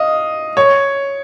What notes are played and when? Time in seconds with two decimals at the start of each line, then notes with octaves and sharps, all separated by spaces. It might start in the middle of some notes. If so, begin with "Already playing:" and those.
Already playing: D#5 F5
0.57 C#5